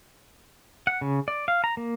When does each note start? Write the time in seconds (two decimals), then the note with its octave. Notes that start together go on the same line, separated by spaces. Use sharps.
0.87 F#5
1.01 C#3
1.28 D5
1.48 F5
1.64 A#5
1.77 A#3